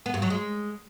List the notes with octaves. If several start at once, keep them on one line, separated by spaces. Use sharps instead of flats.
B3
G2
F#3
G#3